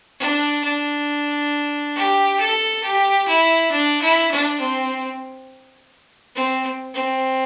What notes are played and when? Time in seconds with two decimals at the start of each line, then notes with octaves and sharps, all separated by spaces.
0.20 D4
0.64 D4
1.96 G4
2.40 A4
2.83 G4
3.28 E4
3.71 D4
4.02 E4
4.31 D4
4.60 C4
6.36 C4
6.94 C4